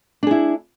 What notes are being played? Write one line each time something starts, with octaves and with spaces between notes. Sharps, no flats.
D4 E4 G#4